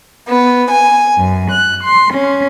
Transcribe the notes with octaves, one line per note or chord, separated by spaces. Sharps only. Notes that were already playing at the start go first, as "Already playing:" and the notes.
B3
G#5
F#2
F#6
C6
C#4